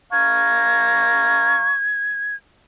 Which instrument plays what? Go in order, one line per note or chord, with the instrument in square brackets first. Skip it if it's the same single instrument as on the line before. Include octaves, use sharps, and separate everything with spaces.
[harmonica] F5 A#5 C#6 [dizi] G#6